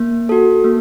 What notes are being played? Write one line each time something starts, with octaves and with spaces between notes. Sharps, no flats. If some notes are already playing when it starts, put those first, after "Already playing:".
Already playing: A#3
F#4 A4
A#3